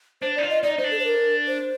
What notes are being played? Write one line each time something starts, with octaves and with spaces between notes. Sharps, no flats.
D4 C5
D#4 D5
F4
D#5
D#4 D5
D#4 C5
D4
A4
C5
A#4
C5